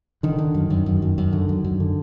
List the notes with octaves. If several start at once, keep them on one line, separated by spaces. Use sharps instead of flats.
D3 D#3
D3
F#2
F#2
F#2
F#2
F#2
D3
F#2
F#2
D3